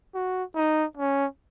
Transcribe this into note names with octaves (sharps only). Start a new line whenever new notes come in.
F#4
D#4
C#4